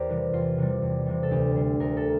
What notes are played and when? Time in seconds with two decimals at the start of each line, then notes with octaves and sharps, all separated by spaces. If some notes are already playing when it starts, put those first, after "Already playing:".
Already playing: E2 G4 A#4 C5 D5
0.09 C3 E3 G3
0.33 E2 F4
0.58 C3 E3 G3
0.82 E2
1.06 C3 E3 G3
1.23 A4
1.31 D2 G4
1.55 D3 G3
1.80 D2 A#4
1.97 A4